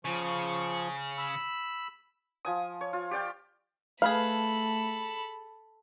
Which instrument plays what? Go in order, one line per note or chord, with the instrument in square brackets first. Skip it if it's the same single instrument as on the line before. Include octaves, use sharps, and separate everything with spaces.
[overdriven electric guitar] C#3 [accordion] F3 C#6
[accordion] B5 E6
[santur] F3 G#5 D#6
C#5
F4
G4 D5 G5
[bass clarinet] A3 [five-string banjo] G#4 B4 F5 [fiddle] A4 B5